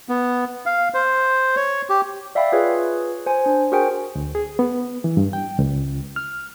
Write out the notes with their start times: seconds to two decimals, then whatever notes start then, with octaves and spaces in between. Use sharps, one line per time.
0.09 B3
0.66 F5
0.94 C5
1.56 C#5
1.89 G4
2.35 D5 E5 F5 G5 B5
2.52 F4 G#4 B4 C#5
3.26 C5 G#5
3.46 D4
3.72 F#4 G#4 A#4 C5 G5 G#5
4.15 D2
4.35 G#4
4.59 B3
5.04 E3
5.17 G2
5.33 G5
5.59 C#2
6.16 F6